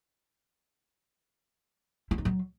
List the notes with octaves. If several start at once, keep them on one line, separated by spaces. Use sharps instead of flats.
E4
D#4
F#3